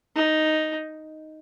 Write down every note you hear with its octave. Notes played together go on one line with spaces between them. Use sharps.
D#4